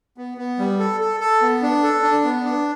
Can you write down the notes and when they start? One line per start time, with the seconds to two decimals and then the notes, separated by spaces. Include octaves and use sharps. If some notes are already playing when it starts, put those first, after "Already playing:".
0.18 B3
0.38 B3
0.59 G3
0.79 A4
1.01 A4
1.20 A4
1.42 B3
1.62 D4
1.83 A4
2.03 D4
2.24 B3
2.44 D4